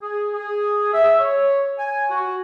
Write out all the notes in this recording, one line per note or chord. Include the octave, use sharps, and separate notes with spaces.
G#4
G#4
E5
C#5
G#5
F#4